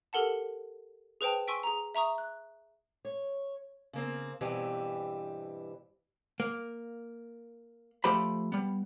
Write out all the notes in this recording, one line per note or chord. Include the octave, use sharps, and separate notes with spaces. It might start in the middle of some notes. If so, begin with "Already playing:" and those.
G4 A4 A#4 F#5 A5
G#4 B4 C5 G5 A5
G#5 C6 C#6 E6 B6 D7
G#4 A#5
E5 A#5 C#6 D#6
F#6
C#5
C#3 A#3 C4
G2 B2 E3 C4 G4 G#5
A#3
F3 A3 G4 C5 B5
G3 B3